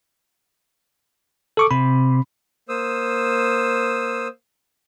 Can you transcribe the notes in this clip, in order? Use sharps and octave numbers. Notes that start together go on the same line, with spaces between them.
A4 C#6 D6
C3 B5
A#3 C5 D#6 E6